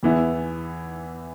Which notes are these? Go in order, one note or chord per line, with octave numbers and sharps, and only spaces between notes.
E2 E3 B3 E4